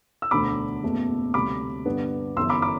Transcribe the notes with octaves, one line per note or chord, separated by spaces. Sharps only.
E6
E1 D2 D3 B5 D6
F#1 E2 B2 A3
D2 C3 G3 B5 D6
G2 D3 G3 B3
G1 F#2 E3 C6 E6
B5 D6
B5 D6